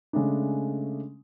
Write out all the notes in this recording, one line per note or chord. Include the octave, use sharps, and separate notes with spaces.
C#3 G#3 A3 C#4 D4